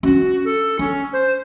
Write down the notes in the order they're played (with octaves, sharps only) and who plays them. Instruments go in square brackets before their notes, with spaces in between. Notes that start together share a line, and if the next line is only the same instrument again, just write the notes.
[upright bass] C#4 D4 [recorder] F#4
[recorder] A4
[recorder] C#4 [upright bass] D4
[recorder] C5